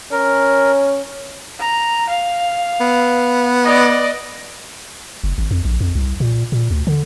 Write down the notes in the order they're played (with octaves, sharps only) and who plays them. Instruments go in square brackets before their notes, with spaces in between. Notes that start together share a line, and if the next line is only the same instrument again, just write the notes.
[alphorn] C#4 [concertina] A#4
[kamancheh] A#5
F5
[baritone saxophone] B3
[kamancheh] D5 D#5
[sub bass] F#1
G#1
F2
A#1
F2
C2
A#2
A#2
D2
D3